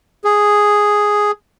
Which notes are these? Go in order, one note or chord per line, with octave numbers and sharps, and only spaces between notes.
G#4